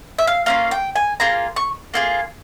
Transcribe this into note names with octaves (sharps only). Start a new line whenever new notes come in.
E5
F5
A#3 C#4 F4 F5
G5
G#5
A#3 F4 G#4 A#5
C#6
A#3 F4 G#4